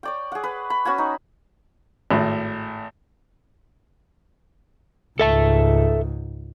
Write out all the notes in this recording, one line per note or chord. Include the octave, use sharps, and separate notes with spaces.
C#5 D5 G5
G#4 F#5
B4
B5
C#4 F#4 F#5 G#5
D#4
G#1 A2
C#2 G#2 A4 E5 A5